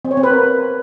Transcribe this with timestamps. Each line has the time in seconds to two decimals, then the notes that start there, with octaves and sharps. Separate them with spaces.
0.05 C4
0.11 C#5
0.17 C4
0.23 B4
0.30 A#4